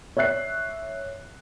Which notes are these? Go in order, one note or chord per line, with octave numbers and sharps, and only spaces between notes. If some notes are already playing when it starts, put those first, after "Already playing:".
C#5 D5 E5 F#6 C7